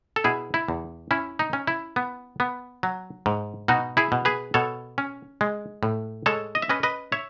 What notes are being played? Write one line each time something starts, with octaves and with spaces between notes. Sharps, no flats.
A4
B2 E4 G#4
E4
E2
C#4 E4
D#4
C#4
E4
B3
B3
F#3
G#2
B2 D#4 F#4
E4 G#4
B2
G#4 B4
B2 A4 C#5
C#4
G#3
A2
G#3 A4 C#5
D#5
E5
C#4 B4 D#5
B4 D#5
C#5 E5